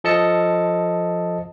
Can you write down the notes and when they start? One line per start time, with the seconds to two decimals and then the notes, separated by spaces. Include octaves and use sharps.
0.04 F3 A4 D#5 A5 C#7